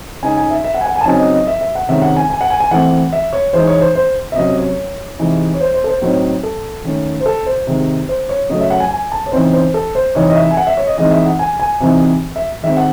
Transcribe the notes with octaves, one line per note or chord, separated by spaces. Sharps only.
C#3 G#3 D#4 G#5
G#5
E5
E5
F#5
G#5
F#5
G#5
A5
C#3 F#3 C4 D#4 G#5
D#5
D#5
E5
E5
F#5
C3 D#3 G#3 C#4 E5
F#5
G#5
G#5
F#5
G#5
G#5
E3 A3 C4 F#5
E5
C#5
E3 G#3 D#4 C5
C#5
C5
C5
E5
C3 F#3 C#4 D#5
C#5
C3 E3 G#3 D#4
C#5
C5
C5
A4
C5
A2 F#3 C4 D#4
A4
D#3 A3 C#4
C5
A4
C5
C3 D#3 G#3
C5
C#5
C#3 F#3 A3 D#5
E5
F#5
G#5
G#5
A5
C#5
C#3 E3 C4 D#4 C5
C5
A4
C5
C3 E3 C4 D#4 C#5
D#5
E5
G#5
F#5
E5
C#5
D#5
E3 G#3 C4 D#4 D#5
E5
F#5
G#5
G#5
C3 E3 C4 D#4
E5
D#3 G#3 C4 E5
F#5